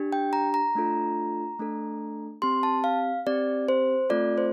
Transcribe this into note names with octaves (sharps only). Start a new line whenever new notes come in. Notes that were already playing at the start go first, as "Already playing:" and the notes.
Already playing: D4 G4
G5
A#5
A#5
A3 D4 F4 A4
A3 D4 A4
C4 G4 C6
A5
F5
C4 G4 D5
C5
A3 C4 F4 A4 D5
C5